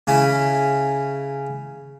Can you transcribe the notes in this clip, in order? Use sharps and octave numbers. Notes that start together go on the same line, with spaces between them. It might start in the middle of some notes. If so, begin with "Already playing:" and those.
C#3 C#4 E4